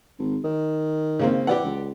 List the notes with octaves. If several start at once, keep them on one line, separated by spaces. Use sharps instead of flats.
G#1
D#3
C#3 A#3 C4
E3 G4 D5 F#5
C#2